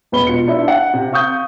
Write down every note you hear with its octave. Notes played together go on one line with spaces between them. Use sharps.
E1 B2 B4 B5 G7
B2 F4 C#7
D4 E4
F#5
C3
F5 C#6 D#6 G6